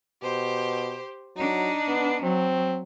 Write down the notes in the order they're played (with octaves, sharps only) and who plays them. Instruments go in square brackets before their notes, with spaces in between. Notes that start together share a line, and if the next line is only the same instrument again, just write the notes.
[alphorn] B2 [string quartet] G4 C5
[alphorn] F#3 [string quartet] D4 D#4
[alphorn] B3
[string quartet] F#3 [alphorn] C4